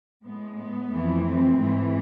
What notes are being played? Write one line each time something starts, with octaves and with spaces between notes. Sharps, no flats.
A2 G#3 B3
B3
F2 E3 A3
A3 C4
G#2 E3 A3